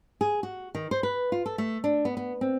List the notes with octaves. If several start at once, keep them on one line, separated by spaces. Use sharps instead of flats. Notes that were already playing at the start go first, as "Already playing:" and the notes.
G#4
F#4
D#3
C5
B4
F4
A4
A3
D4
B3
B3
C4